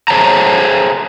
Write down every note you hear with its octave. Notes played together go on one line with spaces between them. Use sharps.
G#4 C5 C#5 G5 A5 A#5